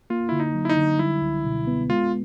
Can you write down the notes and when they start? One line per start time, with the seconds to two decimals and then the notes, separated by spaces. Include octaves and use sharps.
0.10 A#3 F4
0.29 D3 E4
0.40 D#4
0.54 F#3
0.65 E4
0.69 D#4
0.77 D3
0.99 G3 E4
1.21 C#2
1.45 B2
1.67 B3
1.90 G#3 F4